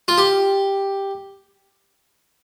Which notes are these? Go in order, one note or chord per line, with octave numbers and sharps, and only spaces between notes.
F4
G4